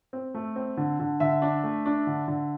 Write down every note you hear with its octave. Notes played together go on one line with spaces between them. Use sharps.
C4
A3
C4
D3
D3
D3 E5
D4
A3
D4
D3
D3